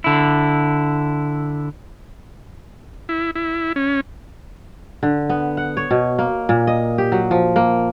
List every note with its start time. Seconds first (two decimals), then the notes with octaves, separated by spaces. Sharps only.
0.04 D3 E4
3.09 E4
3.35 E4
3.76 C#4
5.03 D3
5.29 B3
5.57 F#5
5.77 C#5
5.91 B2
6.19 A#3
6.49 A#2
6.67 D#5
6.98 G4
7.12 F#3
7.31 F3
7.56 A#3